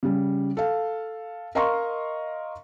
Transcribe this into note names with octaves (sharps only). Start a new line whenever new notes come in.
C#3 G3
A4 F5
A#4 D#5 F5 A#5 C6 C#6